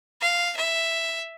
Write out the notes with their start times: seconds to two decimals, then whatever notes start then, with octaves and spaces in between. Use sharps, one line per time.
0.21 F5
0.56 E5